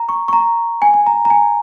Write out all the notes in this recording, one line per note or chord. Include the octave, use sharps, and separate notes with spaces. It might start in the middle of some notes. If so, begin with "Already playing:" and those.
Already playing: A#5
C#6
C#6
A#5
G#5
G#5
A#5
A#5
G#5